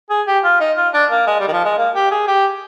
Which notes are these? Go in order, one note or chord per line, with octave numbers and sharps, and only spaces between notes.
G#4
G4
F4
D#4
F4
D4
A#3
G#3
G3
D#3
F3
G#3
A#3
G4
G#4
G4